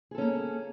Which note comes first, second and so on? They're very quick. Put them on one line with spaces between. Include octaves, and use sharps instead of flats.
G#4 A4 C#4 A#3